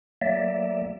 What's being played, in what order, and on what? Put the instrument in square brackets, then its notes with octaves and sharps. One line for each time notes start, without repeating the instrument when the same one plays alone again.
[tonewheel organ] F#3 A3 A#3 D5 E5